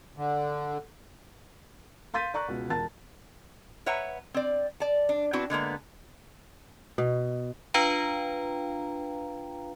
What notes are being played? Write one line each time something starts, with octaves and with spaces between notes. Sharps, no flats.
D3
F5 C6 G6 A6 B6 D#7
D5 A#5 C#6 F#6
C#2 B2
E1 A#4 A5 A6
B4 C#5 E5 F#5 A#5
C4 D5
D5 A5
D4
B3 C4 D4 E4 F#4
D3 G#3 A#3 B3
B2
D4 F4 B4 F5 G5 A#5